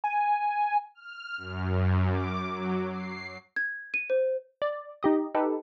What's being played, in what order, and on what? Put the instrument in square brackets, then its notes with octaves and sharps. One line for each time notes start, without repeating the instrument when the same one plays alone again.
[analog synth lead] G#5
[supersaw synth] F6
F#2
D6
F#3
C7
[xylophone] G#6
D#7
C5
[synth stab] D5
D#4 G4 D#5
D#4 G4 A4 B4